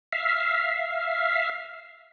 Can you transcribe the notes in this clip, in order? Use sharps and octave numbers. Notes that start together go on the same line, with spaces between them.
E5 F5